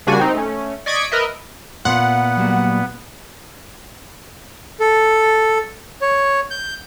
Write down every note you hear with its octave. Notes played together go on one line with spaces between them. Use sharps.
C#3 G3 A#3 D4 F#4 G#5
C4 D#4
A3 C#4
D5 D#5 C#6 G#6 B6 D7
A#4 B4 D#5 E5
A#2 B3 F#5 C6
F#3 G3 A#3
A4
C#5
G6